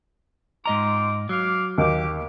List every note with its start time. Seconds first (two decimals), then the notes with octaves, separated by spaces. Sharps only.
0.66 G#2 C4 F4 D#5 A#5 D6
1.29 F#3 F5 D6
1.78 D#2 G4 D6